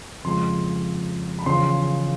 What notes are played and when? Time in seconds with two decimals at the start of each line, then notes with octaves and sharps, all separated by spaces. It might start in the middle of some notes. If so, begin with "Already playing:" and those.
0.24 F2 C#3 F3 G#3 C6
1.39 B5
1.46 E2 C#3 F3 C6